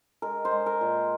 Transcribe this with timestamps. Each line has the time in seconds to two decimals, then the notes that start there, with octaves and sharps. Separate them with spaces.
0.22 G#3 A#4
0.45 C5
0.51 G#3
0.66 A#4
0.81 A#2